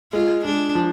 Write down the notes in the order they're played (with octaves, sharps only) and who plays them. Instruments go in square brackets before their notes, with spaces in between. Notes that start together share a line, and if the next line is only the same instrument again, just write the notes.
[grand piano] G#3 [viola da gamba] F4
[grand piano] G#3 [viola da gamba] D4
[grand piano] F3